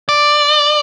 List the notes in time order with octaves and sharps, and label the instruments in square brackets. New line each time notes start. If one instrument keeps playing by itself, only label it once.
[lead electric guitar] D5